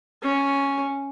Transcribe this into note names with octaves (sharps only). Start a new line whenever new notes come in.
C#4